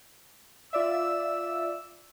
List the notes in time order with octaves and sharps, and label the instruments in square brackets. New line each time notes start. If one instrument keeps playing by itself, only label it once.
[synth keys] F4 D5 E5 [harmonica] E6